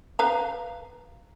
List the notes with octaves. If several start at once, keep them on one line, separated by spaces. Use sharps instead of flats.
B4 F5 A#5